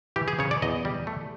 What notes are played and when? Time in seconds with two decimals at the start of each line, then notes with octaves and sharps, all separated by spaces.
0.16 E3 G4
0.28 G#4
0.39 C#3 C#5
0.51 D5
0.62 E2 D#5
0.85 G3
1.07 A3